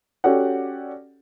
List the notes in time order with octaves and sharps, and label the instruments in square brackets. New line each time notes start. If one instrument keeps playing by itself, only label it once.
[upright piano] C#4 F#4 G4 A4 D5 F#5